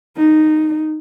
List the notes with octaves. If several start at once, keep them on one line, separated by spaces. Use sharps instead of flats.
D#4